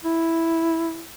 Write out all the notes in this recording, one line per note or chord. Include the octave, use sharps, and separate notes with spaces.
E4